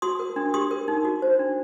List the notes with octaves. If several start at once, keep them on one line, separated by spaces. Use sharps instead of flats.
F#4 C6 D#6
A#4
D4
G4 C6 D#6
A#4
D#4
F#4
C5
D4